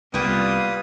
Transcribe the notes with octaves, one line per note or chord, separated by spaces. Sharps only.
C2 G3 A#3 B3 F4 B4 G5 D#6